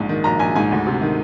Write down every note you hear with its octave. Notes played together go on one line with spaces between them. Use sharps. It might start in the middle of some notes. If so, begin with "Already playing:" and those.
Already playing: A#1 G#2
D#3
A#1 A#5
A#1 G#5
G#2 G#5
D2
C3
D#3